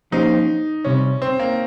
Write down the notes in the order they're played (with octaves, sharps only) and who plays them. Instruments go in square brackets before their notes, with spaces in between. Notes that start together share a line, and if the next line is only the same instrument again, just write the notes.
[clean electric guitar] F3 A#3 C#4 G4 C5 [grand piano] D#4
[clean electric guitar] C2 C3 G3 [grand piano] C#4
[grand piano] C4
A#3